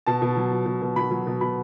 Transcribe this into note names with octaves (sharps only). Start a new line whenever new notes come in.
B2 A5
B2
F#3
F#3
B2
B2
F#3 B5
F#3
B2
B2 B5